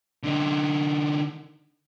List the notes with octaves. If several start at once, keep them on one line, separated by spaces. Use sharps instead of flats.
D3 D#4